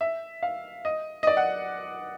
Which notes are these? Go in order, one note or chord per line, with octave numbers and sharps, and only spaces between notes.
E5
F5
D#5
D#5
D5
F#5